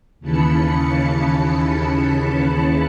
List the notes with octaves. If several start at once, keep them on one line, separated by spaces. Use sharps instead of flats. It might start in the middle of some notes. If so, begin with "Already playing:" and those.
D#2 C#3 E3 A5 B5 C#7